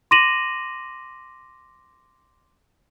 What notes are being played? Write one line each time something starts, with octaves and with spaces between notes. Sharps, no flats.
C6 D6 A#6 D#7 E7 F#7